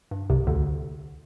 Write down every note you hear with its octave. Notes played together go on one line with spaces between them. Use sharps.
G2
C2 C3
D2 D3